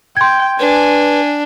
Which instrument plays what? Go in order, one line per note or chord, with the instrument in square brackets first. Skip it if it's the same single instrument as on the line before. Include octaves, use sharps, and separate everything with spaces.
[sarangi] G5 [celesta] C6 G#6
[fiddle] D4 [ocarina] B4 [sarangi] G#5